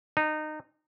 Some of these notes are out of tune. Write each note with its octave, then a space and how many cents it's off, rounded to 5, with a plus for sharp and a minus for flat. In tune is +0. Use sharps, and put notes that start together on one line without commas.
D#4 -20